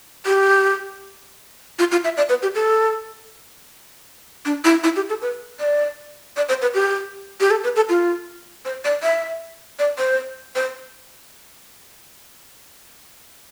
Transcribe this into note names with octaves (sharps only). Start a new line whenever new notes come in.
G4
F4
F4
E5
D5
B4
G4
A4
D4
E4
E4
G4
A4
B4
D5
D5
C5
B4
G4
G4
A4
B4
A4
F4
C5
D5
E5
D5
C5
C5